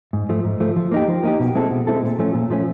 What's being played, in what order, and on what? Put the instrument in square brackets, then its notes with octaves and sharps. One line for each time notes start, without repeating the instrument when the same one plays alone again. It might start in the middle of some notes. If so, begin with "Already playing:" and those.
[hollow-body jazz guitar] G#2
F3 A3
G#2
F3 A3
F3
A#3 D#4 G4
F3
A#3 D#4 G4
B2
G#3 C4 E4 A4
B2
G#3 C4 E4 A4
A#2
F3 A3 C#4
A#2
F3 A3 C#4